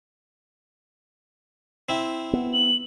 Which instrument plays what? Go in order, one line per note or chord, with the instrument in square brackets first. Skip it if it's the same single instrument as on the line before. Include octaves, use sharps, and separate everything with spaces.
[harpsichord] C4 E4
[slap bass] B3
[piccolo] F#7